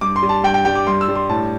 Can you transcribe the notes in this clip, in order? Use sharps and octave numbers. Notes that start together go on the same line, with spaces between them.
G2 D6
C6
G3
A5
G2 G5
G5
G3 G5
D6
G2 C6
E6
G3
C6
A2 A5